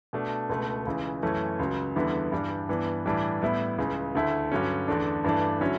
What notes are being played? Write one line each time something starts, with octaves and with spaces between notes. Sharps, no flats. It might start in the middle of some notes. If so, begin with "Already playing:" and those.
B2 A3 D4
C#2 B2 A3
C#2 C#3 E3
F#2 E3 A3 C#4
C#2 C#3 F#3
E2 D3 G3 B3 E4
G2 E3 G3 D4
G2 E3 B3 D4
A2 E3 G3 D4
A2 G3 B3 E4
C#2 C#3 E3
D2 D3 A3 E4
G2 D3 F#3 C#4
E2 D3 A3 D4
G2 E3 A3 D4
D3 F#3 C#4 E4